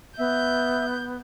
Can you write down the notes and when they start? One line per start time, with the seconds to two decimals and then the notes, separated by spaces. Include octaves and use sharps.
0.18 B3 E5 G6